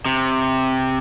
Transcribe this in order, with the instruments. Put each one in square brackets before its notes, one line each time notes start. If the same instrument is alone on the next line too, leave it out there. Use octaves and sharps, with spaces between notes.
[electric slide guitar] C3